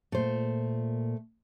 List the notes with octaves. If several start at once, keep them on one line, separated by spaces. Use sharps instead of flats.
A#2 A3 C5